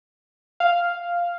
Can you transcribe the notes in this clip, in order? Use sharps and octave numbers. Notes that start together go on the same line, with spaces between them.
F5